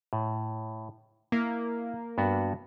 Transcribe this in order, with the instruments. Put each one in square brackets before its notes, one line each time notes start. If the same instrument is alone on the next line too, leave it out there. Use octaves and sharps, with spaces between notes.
[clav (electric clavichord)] A2
[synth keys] A#3 [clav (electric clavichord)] E4
[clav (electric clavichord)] G2 B3 F#4